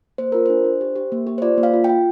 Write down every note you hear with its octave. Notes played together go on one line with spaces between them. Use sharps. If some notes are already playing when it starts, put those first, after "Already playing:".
A#3 C5
F4 A#4
D4 C5
D4
G4
G4
A#3
G4
C5
F4 D5
A#3
F5
F4
G5
F4